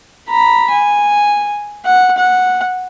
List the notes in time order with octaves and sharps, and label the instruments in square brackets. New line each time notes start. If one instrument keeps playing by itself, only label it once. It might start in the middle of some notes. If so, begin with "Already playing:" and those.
[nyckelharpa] A#5 B5
G#5
F#5
F#5